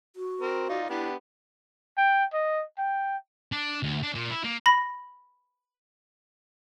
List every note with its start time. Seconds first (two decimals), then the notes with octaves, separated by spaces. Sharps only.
0.16 F#4
0.41 C4 A#4
0.69 D#4 F4 D5
0.89 B3 D4 E4 G4
1.97 G5
2.33 D#5
2.78 G5
3.52 D4
3.83 D2
4.03 D4
4.15 A#2
4.31 E4
4.44 A#3
4.66 B5 A#6